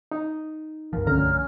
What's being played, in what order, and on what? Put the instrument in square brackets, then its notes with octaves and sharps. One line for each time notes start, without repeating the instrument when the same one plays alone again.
[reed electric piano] D#4
[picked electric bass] C2 G2 F3 [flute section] A#4
[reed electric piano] D2 D3 A#5 [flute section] C#4 F6